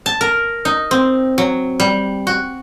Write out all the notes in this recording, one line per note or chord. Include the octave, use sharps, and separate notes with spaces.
A5
A#4
D#4
C4
F#3
G3
F#4